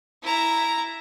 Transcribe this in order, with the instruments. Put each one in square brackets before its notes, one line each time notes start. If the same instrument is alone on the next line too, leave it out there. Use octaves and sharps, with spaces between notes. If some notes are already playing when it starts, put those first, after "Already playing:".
[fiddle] E4 A#5